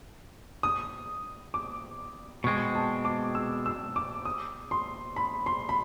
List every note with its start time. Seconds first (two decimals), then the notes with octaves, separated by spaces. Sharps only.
0.63 D#6
1.54 D6
2.44 B2 G#3 C4 C#6
2.75 A5
3.05 D6
3.35 E6
3.66 E6
3.96 D6
4.25 D#6
4.71 C6
5.16 B5
5.46 C6
5.69 B5